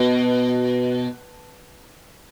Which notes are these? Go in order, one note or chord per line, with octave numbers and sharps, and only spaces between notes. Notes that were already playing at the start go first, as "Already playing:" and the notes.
Already playing: B2